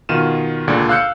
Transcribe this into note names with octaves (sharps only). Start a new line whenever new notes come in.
B2 D#3 F4 F6 D#7 E7
C#2 A#2 D3
F5 E6 F#6 G6 C#7